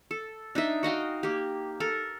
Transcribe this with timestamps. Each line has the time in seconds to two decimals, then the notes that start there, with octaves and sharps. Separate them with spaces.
0.11 A4
0.55 D4 D#4 D#5 E5
0.83 F#4 D#5 F5 G5
1.23 A#3 G4
1.80 A4 A#4